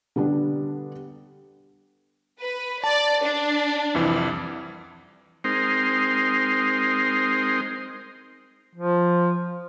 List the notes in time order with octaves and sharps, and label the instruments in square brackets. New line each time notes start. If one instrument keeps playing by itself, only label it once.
[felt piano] D3 G3 B3 D4
[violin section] B4
[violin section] D5 [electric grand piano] A5
[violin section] D4
[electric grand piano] C2 F2 E3
[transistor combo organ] G#3 C4 D#4 A#4 C5
[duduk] F3